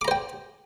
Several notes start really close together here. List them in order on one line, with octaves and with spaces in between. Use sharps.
D6 A#5 C5 G5